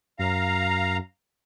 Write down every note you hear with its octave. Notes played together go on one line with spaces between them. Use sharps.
F#2 F5 A#5